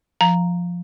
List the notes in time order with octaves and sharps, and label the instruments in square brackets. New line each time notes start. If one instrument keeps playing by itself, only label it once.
[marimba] F3 [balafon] A#5